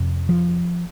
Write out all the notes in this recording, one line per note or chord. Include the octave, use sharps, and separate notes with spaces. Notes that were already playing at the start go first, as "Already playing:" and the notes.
Already playing: F2 C3
F3